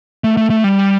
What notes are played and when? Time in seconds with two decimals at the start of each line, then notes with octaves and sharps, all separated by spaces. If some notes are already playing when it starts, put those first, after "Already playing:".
0.24 A3
0.37 A3
0.50 A3
0.64 G3